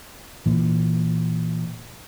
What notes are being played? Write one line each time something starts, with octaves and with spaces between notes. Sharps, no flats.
A#2 E3